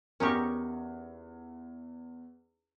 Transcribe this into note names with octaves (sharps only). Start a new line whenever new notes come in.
E2 C#4 D#4 G4 A#4 C#6